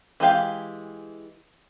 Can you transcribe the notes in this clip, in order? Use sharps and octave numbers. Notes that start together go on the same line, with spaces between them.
E3 G#3 G4 F5